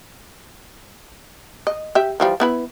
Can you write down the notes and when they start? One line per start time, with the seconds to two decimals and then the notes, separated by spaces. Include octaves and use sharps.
1.67 D#5
1.95 G4 E5
2.20 E3 F3 G3
2.40 B3 E4 B4